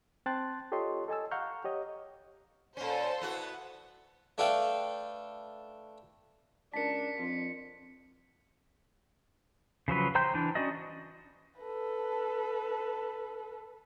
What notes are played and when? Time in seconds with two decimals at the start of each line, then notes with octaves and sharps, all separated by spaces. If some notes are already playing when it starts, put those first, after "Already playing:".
0.26 C4 G5 A5 C6 F#6 A6
0.72 F4 G4 A4 C#5 D#5 C6
1.08 A4 D#5 G#5 A5 E6
1.31 F5 F#5 A#5 C#6 F6 G6
1.64 G4 C#5 D#5
2.77 A#2 C#4 A4 C5
3.21 B3 E4 F#4
4.38 A3 D4 A4 B4 F5 G5
6.74 C#2 D4 A#4 A5 B6 C#7
7.19 F2 F4
9.88 C#3 F3 F#3 B4
10.15 C5 G5 A#5 C6 G6
10.34 E3 D4
10.55 C#4 F#4 D5 D#5
11.60 A4 B4